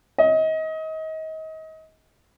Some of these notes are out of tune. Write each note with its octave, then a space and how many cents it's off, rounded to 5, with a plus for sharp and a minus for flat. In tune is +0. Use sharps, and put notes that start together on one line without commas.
D#5 +30